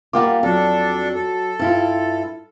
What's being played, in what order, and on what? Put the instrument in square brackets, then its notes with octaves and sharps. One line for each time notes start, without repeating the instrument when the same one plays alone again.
[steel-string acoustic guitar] G3 A#3 F4 [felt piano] F#5 G5 D6
[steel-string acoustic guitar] F2 [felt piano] F#3 [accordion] D4 A4
[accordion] A4
[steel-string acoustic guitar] G2 E4 F4 [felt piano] A5